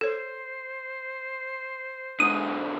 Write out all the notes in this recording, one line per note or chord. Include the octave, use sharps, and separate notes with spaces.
A4 C5 C#5
G#2 D3 D#6